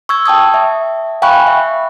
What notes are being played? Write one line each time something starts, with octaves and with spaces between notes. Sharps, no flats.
C#6 E6 G#6
G5 A5 D#6 G#6
E5
F5 G5 G#5 B5 C#6 F#6
E5